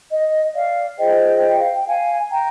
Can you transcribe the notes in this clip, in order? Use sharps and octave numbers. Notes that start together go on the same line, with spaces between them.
D#5
D5 F5
F4 G#4 C5 D#5 G5
F5
G5
F5 G#5
G5 A#5